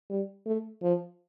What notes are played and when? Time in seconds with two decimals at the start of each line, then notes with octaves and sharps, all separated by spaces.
0.10 G3
0.46 A3
0.82 F3